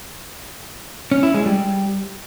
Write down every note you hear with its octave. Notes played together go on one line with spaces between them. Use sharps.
C#4
E4
G#3
G3